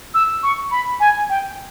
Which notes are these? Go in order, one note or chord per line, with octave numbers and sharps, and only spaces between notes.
E6
C#6
B5
G#5
G5